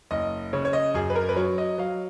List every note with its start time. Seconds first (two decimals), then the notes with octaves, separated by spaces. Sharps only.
0.11 F#1 D#5
0.53 C#3 C#5
0.65 C#5
0.73 D#5
0.94 F#2 G#4
1.10 B4
1.15 A#4
1.29 B4
1.36 F#3 C#5
1.58 D#5
1.78 F#3 F5